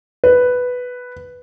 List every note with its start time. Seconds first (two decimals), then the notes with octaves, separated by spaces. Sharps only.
0.24 B4